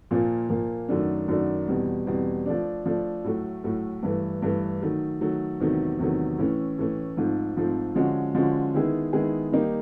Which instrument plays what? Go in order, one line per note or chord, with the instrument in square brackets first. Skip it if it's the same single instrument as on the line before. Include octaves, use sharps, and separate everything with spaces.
[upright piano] A#2 F3 A#3
A#2 F3 A#3
F#2 D#3 F#3 A3 D4
F#2 D#3 F#3 A3 D4
E2 B2 G3 C4
E2 B2 G3 C4
F3 A3 D4
F3 A3 D4
A2 F#3 A3
A2 F#3 A3
G2 E3 A3
G2 E3 A3
D#3 F#3 A3
D#3 F#3 A3
E2 C3 D#3 F#3 A3
E2 C3 D#3 F#3 A3
A2 E3 A3 C#4
A2 E3 A3 C#4
G#2 F3 A3 C4
G#2 F3 A3 C4
D3 F3 G#3 C#4 F#4
D3 F3 G#3 C#4 F#4
D#3 G#3 B3 E4 G#4
D#3 G#3 B3 E4 G#4
D#3 G3 A#3 D#4 G4